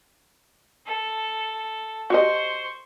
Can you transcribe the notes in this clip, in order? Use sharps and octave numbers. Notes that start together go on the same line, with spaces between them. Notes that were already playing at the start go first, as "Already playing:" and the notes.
A4
F#4 G4 C5 D#5 C#6